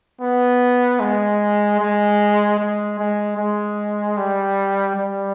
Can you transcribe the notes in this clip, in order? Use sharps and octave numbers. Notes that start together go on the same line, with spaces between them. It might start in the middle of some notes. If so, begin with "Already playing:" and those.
B3
G#3
G#3
G#3
G#3
G#3
G3
G3